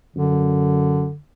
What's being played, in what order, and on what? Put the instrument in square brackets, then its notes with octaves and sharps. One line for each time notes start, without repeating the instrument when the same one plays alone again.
[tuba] F#2 [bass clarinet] D3